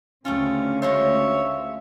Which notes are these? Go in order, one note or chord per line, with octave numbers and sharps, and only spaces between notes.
D2 C#3 A3 C4 C#4 F4
G#3 F4 C5 C#5 E5